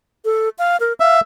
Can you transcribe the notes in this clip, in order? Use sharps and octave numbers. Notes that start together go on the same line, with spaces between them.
A4
F5
A#4
E5 F5